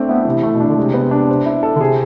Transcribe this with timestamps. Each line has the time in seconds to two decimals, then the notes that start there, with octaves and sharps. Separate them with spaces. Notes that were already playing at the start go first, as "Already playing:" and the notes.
Already playing: A3 C4 D4
0.08 B3 E4
0.25 C3 E3
0.43 A3
0.52 B2
0.60 D4
0.68 D3
0.77 C3 G#3
0.94 B3
1.11 D4
1.29 C5
1.46 E4
1.63 A4
1.76 D3
1.80 C3 G#4